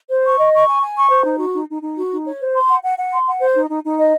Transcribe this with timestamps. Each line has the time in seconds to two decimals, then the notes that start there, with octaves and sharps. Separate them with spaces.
0.09 C5
0.24 C#6
0.38 D#5
0.53 C#6
0.67 G#5
0.81 G#5
0.96 C#6
1.10 C5
1.24 D#4
1.39 F#4
1.53 D#4
1.68 D#4
1.81 D#4
1.96 F#4
2.11 D#4
2.24 C#5
2.39 C5
2.54 C6
2.68 F#5
2.82 F#5
2.97 F#5
3.11 C6
3.26 F#5
3.40 C5
3.54 D#4
3.69 D#4
3.83 D#4
3.98 D#5